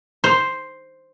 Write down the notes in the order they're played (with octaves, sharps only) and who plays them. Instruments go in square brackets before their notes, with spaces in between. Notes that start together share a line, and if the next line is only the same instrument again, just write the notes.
[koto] C5